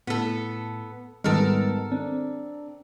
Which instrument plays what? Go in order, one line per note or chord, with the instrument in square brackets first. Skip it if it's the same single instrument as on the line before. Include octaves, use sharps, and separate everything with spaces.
[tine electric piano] A2 [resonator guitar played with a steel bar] B3 A4
[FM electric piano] G#2 D#3 G3 [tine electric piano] G#3 B3 D#5 [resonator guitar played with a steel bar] A4 A#4
[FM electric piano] C4 [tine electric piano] D4